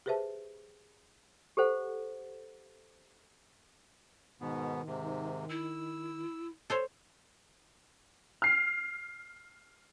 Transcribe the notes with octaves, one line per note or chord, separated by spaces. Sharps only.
G4 G#4 B4 C5 E5 A5
G4 A4 C5 F#5
G#2 B2 D#3 B3
G#2 C3
E4 E6
A4 C5 C#5
F6 C7